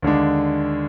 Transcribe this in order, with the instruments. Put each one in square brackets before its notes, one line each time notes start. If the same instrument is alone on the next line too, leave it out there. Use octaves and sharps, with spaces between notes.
[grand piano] D#2 D3 G#3 D4